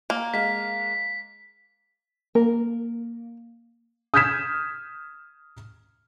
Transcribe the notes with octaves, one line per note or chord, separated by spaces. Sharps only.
A#3
G#3 F5 B6
A#3 A#4
D#6 F6 G6 G#6 B6 E7